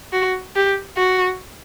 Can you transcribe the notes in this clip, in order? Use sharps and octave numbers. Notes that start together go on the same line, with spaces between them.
F#4
G4
F#4